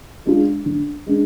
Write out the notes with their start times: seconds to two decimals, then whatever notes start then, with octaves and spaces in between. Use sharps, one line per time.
0.26 G#3 D4 F4
0.66 D3
1.07 G#3 D4